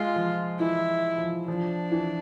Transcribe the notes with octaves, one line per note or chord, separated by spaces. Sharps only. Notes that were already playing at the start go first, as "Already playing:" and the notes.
Already playing: G#3 F4
F3
E3 E4
F3
F3 D4
E3